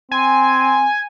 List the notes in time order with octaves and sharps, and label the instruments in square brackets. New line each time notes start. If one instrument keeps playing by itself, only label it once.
[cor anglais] C4 [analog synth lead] G#5